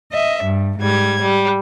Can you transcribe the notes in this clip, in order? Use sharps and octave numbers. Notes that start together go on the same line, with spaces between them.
D#5 E5
G2
G#2 G3 G#6
G3